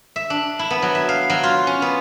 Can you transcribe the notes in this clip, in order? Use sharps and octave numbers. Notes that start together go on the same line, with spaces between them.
E5
D4
E4
B3
F#3
E5
F5
F#3
F4
C#4
B3